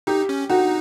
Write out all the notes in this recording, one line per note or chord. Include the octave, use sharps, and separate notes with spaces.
D#4 G4
C#4
D#4 F#4